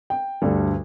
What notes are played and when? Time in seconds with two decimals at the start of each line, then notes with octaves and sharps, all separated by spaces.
0.10 G5
0.42 D2 G2 G3 A3